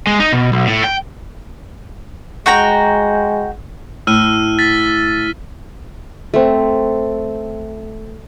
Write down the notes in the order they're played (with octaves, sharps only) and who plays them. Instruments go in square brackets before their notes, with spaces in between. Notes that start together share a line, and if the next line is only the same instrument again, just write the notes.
[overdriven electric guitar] G#3
D#4
B2
B1
A2
G5
[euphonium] G#3 [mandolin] F#4 G5 A#5
[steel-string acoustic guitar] A2 [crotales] E6 F6 D#7
[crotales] A6 B6
[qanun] A3 C4